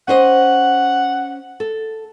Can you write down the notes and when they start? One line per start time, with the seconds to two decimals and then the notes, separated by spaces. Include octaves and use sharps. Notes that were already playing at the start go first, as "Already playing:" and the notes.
0.08 C#4 C5 D#5 F#5
1.60 A4